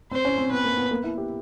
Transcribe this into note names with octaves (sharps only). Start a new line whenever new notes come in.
C4 C5
C#4
C4
B3 B4
A#3
B3
A#3
E4
G4